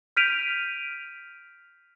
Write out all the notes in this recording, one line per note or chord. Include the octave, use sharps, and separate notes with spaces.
F6 G6 B6 D7 D#7 F7